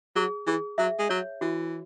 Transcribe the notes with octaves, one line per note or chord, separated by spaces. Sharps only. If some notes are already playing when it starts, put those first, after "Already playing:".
F#3 G#4
E3 G#4
F#3 E5
G#3
F#3 C#5
E3 F#4